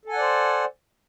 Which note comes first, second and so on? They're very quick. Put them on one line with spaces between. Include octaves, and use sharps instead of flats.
A4 G#5 F#5 D5 C5